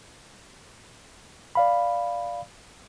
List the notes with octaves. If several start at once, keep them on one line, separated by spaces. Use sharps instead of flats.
D5 F5 B5